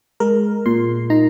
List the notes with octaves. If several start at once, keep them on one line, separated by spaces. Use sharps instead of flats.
G#3 A#4
A#2 C6
D#4 A#5